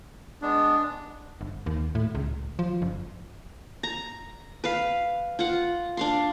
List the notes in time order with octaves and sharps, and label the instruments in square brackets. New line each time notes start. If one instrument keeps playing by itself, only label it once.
[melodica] G#3 B3 [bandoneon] D4
[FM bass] G1
D#2
A2
C#2
F3
F#1
[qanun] A#5
B4 F5
F4 F#5
D4 F5 C6